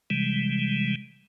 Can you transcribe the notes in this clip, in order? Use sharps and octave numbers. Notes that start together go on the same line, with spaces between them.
C3 E3 G3 G#3